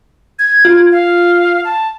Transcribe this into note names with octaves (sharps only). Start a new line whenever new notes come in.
G#6
F4
F5
A5